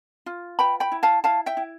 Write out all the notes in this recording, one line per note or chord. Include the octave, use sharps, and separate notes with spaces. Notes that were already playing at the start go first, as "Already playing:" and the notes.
F4
B4 G5 B5
G5 B5
E4
F5 A5
E4 F5 A5
E5 G5
E4